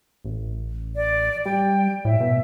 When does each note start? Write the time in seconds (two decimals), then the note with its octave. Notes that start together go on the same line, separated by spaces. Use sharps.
0.24 A1
0.96 D5
1.46 G3 G5
2.05 A2 E5
2.20 B2